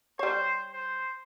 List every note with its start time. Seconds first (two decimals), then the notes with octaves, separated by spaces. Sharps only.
0.19 G3 C5 C#5
0.72 C5